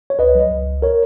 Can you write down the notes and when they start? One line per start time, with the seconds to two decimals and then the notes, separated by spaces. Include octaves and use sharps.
0.10 C#5
0.19 C#2 B4 D#5
0.35 F#3
0.51 C#2
0.67 C#2
0.82 A#4 C#5